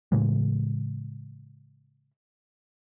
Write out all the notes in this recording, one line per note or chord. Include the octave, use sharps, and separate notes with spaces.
A2 C#3 E3 G#3